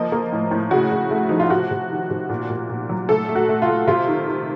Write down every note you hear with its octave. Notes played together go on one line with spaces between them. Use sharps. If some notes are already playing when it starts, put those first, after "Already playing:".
Already playing: F3 A#3 D#5
A#3
A2
A2
C#3 F#4
C#3
A3
F3 D#4
F4
C3 F#4
C3
D#3
C3
A#2
A#2
A#2
F#3
A3 A4
A3
F#4
A3
F4
A3
C3 F4
D#3
D#3